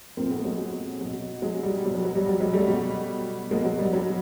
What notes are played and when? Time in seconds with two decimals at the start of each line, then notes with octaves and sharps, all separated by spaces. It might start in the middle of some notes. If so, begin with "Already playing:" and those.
0.17 A#2 F3 A#3 C4
0.31 A3 B3
0.45 F#3 G#3
1.01 B2 F#3
1.42 F#3 G#3
1.63 G3
1.84 B2 F#3 G3
1.95 F#3
2.05 F#3
2.15 G3
2.26 G3
2.40 F#3 G#3
2.54 G3 A3
2.68 B2 F#3
3.51 F#3 G#3 A#3
3.55 B2
3.65 F#3
3.79 G3
3.93 F#3